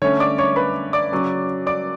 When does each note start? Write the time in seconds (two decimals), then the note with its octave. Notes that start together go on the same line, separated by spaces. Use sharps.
0.02 D3 A3 C#4 C#5 C#6
0.20 D5 D6
0.38 C#5 C#6
0.56 B4 B5
0.93 D5 D6
1.12 C#3 F#3 C#4
1.66 D5 D6